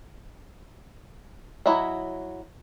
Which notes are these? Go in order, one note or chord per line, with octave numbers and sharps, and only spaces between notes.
F#3 E4 D#5 E5